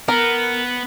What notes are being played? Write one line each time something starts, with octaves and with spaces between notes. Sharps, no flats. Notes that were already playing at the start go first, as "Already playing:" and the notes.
B3 A#4